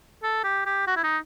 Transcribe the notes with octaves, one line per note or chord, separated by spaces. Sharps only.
A4
G4
G4
F#4
E4
D#4